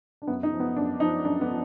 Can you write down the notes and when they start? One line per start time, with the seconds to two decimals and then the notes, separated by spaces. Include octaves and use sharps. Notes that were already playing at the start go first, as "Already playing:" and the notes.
0.22 D4
0.27 F#2 B3
0.43 D#4
0.52 F3
0.60 B3
0.76 F#2 D4
1.00 F3 D#4
1.25 F#2 D4
1.41 B3
1.49 F3